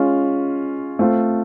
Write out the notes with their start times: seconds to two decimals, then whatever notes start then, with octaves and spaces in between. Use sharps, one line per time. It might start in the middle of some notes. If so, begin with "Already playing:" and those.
Already playing: G#3 C#4 F4
0.99 A3 C4 F4